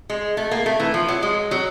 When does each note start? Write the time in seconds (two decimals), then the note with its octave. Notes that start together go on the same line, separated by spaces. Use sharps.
0.10 G#3
0.37 A3
0.51 A#3
0.66 A3
0.80 E3
0.94 F3
1.08 F#3
1.23 G#3
1.51 F#3